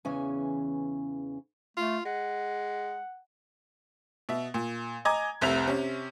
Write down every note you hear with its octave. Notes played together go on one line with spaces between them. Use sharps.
E2 C#3 E3 C#4 G#5
A3 F4
G#3 F#5
B2 E5
A#2
D#5 G#5 A#5 D6 G#6
F1 C2 C3 E5 F7
C3 C#4